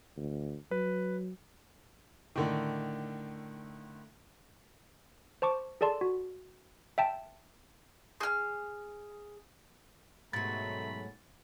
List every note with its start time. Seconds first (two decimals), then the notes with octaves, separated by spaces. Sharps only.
0.17 D2
0.71 F#3 B4
2.36 A2 D3 D#3
5.42 C5 A5 C#6 D6
5.81 G#4 A4 D5 A5 C6
6.01 F#4
6.98 E5 G5 A5
8.21 G#4 F6
10.33 G#2 B2 D#3 F#3 A3 B5 A6